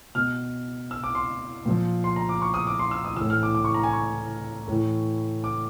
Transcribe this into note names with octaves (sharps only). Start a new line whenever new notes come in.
B2 F6
E6
D6
C6
A#2 F3
C6
A#5
D6
C#6
D#6
D6
C6
E6
D#6
A2 E3 E6
F6
D6
D6
C#6
A#5
G#5
C#6
A2 E3
D6